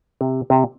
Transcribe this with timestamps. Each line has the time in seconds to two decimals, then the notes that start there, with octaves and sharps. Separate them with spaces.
0.21 C3
0.50 C3